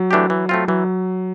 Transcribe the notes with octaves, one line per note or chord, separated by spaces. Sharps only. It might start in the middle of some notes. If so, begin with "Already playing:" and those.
Already playing: F#3
E3 A3 D4 G4
E3
A3 C4 F4
E3 F#3